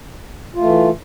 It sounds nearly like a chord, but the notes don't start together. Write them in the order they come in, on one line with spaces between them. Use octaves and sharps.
F4 A3 E3